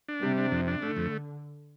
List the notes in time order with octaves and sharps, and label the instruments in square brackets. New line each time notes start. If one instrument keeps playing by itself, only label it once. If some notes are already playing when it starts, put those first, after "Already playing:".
[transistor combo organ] D4
[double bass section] C3 [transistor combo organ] G3
[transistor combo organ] D4
F2
D4
[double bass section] D3 [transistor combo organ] A3
[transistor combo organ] F2